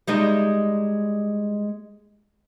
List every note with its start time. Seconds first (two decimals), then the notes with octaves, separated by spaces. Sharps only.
0.07 G3 G#3 D#4